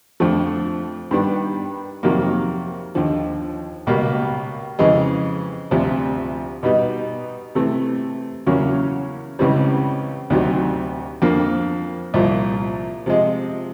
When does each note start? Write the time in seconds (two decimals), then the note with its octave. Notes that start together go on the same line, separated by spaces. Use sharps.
0.20 F2 D3 F3 A3
1.11 G2 D#3 G3 B3 D4
2.03 F2 C3 D#3 F#3 A#3
2.95 D#2 D3 F3
3.87 C#2 B2 G3 A#3
4.79 F2 C#3 E3 G#3
5.71 D2 C3 F3
6.63 B2 G3 B3 D#4
7.55 C3 E3 A3 C4
8.46 E2 C#3 F#3 A#3 C#4
9.39 C#2 C#3 E3 G3 C4
10.30 D2 C3 D#3 F#3
11.22 F2 D3 F3 A#3
12.14 C2 A#2 F3
13.06 C3 F3 G#3